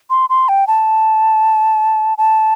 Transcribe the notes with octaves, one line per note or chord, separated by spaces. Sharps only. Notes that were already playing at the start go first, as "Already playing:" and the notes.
C6
C6
G5
A5
A5